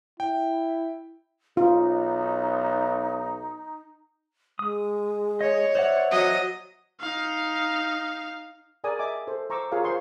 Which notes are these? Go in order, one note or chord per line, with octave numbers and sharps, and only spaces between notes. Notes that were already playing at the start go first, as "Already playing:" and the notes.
E4 G5
B1 D#4 F4
G#3 D#6
C#5 D#5
C5 D5 E5 F#5
F#3 D#5
D#4 F5
G#4 A#4 D5 G#5 D#6
D#5 E5 G#5 D6
A4 C5
C5 A#5 C#6 D6 E6
F4 G#4 A#4 C#5 F5
C5 C#5 F5 G#5 C6 C#6